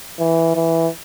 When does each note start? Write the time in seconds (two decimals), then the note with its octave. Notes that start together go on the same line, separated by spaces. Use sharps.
0.19 E3
0.55 E3